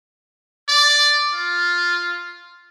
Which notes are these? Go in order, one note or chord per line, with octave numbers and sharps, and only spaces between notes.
D5
F4